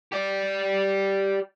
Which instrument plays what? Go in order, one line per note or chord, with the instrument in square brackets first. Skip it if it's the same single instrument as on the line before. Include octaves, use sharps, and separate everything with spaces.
[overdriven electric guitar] G4 D5